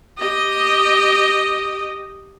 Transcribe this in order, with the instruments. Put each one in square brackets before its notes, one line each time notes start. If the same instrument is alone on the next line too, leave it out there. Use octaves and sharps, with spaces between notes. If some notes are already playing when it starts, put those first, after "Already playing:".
[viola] G4 D#5